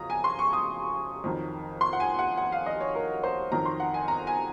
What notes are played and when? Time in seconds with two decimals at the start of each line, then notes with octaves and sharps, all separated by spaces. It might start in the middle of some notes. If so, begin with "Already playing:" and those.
Already playing: F2 C#3 F#3 A#5 D#6
0.10 G#5
0.24 C6
0.39 C#6
0.53 D#6
1.24 F2 D#3 F#3
1.81 C6
1.93 F#5
2.00 G#5
2.19 F#5
2.37 F#5
2.52 F5
2.66 D#5
2.81 C#5
2.95 A#4
3.23 C5
3.51 F2 D#3 F#3 A#5
3.65 C6
3.80 F#5
3.94 G#5
4.08 A#5
4.27 G#5